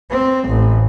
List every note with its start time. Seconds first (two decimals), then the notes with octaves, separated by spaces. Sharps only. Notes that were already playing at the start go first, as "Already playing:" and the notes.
0.10 C4
0.48 A1